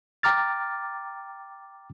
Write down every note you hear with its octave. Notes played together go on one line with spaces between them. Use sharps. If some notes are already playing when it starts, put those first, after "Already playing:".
G5 A#5 D6 F6 A6